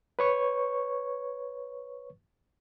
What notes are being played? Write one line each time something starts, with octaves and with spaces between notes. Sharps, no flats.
B4 C#5 C#6